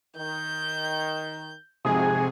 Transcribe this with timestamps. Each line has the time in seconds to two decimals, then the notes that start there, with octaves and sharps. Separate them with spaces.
0.17 D#3 G6
1.85 F2 G#2 C3 F#4 G#4 G#5 D#6